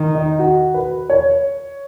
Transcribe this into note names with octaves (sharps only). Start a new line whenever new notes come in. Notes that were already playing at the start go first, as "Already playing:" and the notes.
Already playing: D#3
D#4
F#4
B4
C#5